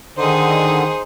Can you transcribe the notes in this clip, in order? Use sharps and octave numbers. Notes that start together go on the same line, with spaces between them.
D3 D#3 D#4 G#4 C5